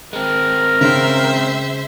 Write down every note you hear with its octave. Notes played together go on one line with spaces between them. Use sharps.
G#3 C4 A#4
C#3 C5 E5